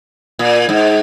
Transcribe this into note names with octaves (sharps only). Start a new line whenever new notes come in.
A#2
G#2